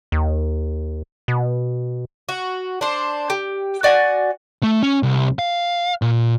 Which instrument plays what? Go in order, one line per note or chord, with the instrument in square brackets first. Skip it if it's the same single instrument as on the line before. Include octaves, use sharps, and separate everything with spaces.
[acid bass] D#2
B2
[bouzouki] F#4
D4 C5
G4
F#4 D5 F#5 G#5
[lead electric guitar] A3
C#4
C2
F5
A#2